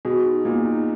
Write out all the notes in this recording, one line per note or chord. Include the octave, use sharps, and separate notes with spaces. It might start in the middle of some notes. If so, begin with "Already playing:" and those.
B2 G#4
D#4
A#2 B3
D#4